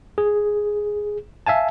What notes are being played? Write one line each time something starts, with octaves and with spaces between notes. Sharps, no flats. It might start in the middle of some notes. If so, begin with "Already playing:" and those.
G#4
E5 F5 G#5 A5